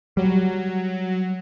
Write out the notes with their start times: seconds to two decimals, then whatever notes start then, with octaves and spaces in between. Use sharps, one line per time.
0.17 F#3 G3